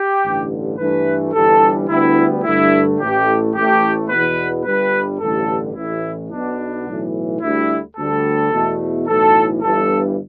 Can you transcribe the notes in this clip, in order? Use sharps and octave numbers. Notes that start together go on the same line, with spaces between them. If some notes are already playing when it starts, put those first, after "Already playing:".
Already playing: G4
A1 G2 D3
G2 E3 A3 B4
G1 G2 E3 G3 A4
D2 D3 G3 B3 E4
G2 D3 A3 E4
A1 A2 A3 G4
A1 A2 A3 G4
E2 B2 B3 B4
G1 G2 G3 B4
A1 G2 D3 A4
A1 A2 E3 E4
B1 B2 B3 D4
B1 A2 E3
D2 D3 G3 E4
D2 D3 G3 A4
E2 B2 A3
B1 A2 E3 A4
G1 G2 E3 A4